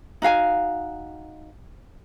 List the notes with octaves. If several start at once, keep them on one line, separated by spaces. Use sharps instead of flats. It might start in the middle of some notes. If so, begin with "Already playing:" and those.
D#4 F#4 F5 G#5